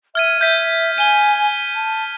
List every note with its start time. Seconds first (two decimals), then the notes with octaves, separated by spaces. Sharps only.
0.15 E5 F6 G#6 D#7
0.41 E5 G6 B6 D#7
0.98 G#5 D#7 G7
1.75 A5